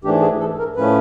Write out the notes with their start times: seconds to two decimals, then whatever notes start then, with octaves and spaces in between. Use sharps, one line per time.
0.04 G#2 E3 A3 D4 G4
0.22 G#4
0.39 A4
0.58 A#4
0.76 A2 F3 A3 C#4 B4